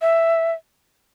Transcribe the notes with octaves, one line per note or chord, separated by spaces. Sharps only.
E5